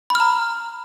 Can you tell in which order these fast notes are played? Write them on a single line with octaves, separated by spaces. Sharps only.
B5 F6 A#5